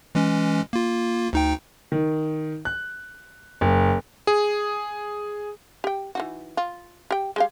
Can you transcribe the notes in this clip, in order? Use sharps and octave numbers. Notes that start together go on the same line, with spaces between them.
E3 G#3 C#4
A#3 F4
D2 D#4 G5
D#3
F#6
F#1
G#4
G4 G5
E3 D#4 F#4
F4
G4 G5
G#3 G4 F5